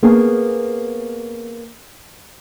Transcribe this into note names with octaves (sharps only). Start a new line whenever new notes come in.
A#3 B3 C#4 G#4